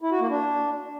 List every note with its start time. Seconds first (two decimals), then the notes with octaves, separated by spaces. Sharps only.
0.01 E4
0.11 F#4
0.20 A#3
0.30 D4